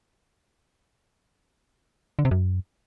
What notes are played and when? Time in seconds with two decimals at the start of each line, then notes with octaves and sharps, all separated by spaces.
2.19 D3
2.25 C3
2.31 F#2